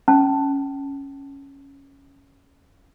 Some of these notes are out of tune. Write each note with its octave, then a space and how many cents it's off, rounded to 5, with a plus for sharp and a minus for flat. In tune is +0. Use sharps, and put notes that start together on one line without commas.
C#4 +0 A5 +0